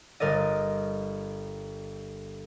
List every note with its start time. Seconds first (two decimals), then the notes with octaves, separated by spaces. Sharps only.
0.20 G1 A#4 D5 D#5